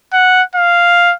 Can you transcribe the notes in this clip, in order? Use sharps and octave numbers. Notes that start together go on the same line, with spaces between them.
F#5
F5